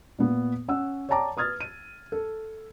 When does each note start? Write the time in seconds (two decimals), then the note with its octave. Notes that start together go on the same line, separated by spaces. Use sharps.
0.18 A#2 B3
0.68 C#4 F#5 E6
1.09 C#5 D5 G5 A5 A#5 D6
1.37 B4 D#6 F6 G#6 A6
1.60 D#7
2.12 A4